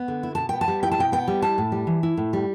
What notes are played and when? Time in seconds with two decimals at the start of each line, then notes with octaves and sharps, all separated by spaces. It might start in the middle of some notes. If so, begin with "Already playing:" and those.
Already playing: B3
0.08 D3
0.23 E4
0.35 B2 A5
0.49 B3 G5
0.61 A5
0.68 G3
0.83 E4 G5
0.92 A5
0.98 B2 G5
1.12 B3 G5
1.28 G3
1.42 E4 A5
1.58 A2
1.72 G3
1.87 E3
2.03 E4
2.17 A2
2.33 G3